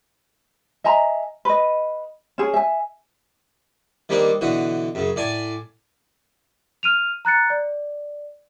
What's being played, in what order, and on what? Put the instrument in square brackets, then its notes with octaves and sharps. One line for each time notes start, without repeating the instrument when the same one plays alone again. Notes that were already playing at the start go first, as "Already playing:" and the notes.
[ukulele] D#5 E5 G#5 A#5
B4 D#5
C#4 G#4
E5 G#5
[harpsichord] D#3 G3 A#3 C4 D4 D#4
B2 D3 E3 F#4
F#2 C#3
A2 D5 G#5 A5
[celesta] F6 D#7 F7
A#5 F#6 A6 C#7
D5